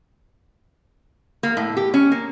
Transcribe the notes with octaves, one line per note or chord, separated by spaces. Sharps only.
A#3
A2
G4
C#4
A#3